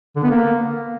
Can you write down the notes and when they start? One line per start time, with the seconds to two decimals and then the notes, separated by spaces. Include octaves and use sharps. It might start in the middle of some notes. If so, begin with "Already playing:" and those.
0.16 D3
0.23 B3
0.30 A#3